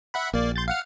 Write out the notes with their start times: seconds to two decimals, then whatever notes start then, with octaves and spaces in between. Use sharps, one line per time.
0.14 E5 F#5 B5
0.34 A#1 A#3 D5
0.56 C6 G6 A6
0.68 F5 F#5 F6